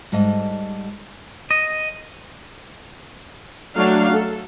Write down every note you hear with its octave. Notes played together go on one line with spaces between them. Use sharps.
G#2 G3 A4 D#5
D#5
F#3 A3 D4 F5
A4